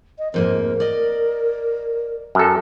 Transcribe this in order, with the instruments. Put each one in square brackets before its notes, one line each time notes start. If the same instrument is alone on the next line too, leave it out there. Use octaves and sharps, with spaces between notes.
[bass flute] D#5
[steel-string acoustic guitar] F2 G#2 A#3 [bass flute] A#4
[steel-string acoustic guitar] D5 D#5
[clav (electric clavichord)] F#2 A4